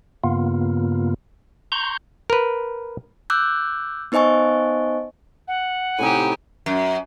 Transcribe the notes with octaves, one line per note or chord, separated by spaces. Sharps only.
G2 C#3 A#3 B3 F4
A#5 C6 C#6 G6
A#4 B4
D6 E6 F#6 G6
B3 D#4 C5 D#5 G#5 C#6
F#5
A2 C3 D#4 G4 G#5
F#2